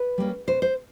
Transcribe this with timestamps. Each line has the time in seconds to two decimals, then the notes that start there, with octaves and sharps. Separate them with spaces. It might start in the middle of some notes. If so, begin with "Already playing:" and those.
Already playing: B4
0.18 G3 A#3 C#4
0.47 B2 C5
0.62 C5